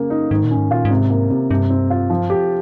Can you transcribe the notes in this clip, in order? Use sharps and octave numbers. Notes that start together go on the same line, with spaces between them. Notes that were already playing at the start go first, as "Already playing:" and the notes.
Already playing: C#3 A#3
D#4
G#2 D#3
A#2
C#4
G#2
A#2 F4
G#2
C3
A#3
C3
G2 C3
C4
F4
F3
G4